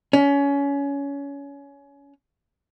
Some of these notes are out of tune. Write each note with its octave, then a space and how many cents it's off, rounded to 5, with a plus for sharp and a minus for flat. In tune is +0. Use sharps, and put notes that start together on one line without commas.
C#4 +25